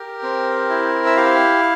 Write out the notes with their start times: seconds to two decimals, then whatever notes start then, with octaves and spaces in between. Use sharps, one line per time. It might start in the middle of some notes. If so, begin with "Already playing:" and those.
Already playing: G4 A#4
0.23 C4
0.70 E4
1.06 E5
1.17 G4 F5